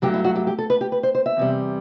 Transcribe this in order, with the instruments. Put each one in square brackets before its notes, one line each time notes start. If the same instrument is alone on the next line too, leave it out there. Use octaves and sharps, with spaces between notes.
[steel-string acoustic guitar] G2 F#3 A3 G4
E4
F#4
G4
G4
A4
B4
G4
B4
C5
C5
E5
E2 C3 G3